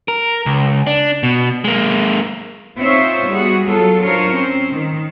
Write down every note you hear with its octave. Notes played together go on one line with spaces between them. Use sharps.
A#4
C#2
D4
B2
G#3 A#3
C4 D#4 F4 C5 C#5 E5
G3 B3 F#4 G#4
F#3 F4 A4
D4 F4 A#4 C5 C#5
C4 C#4 C5
D#3